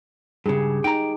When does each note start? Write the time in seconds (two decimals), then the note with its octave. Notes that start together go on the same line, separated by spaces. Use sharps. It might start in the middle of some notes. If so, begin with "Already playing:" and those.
0.46 G2 C#3 G4 G#4
0.84 D#4 G5 A#5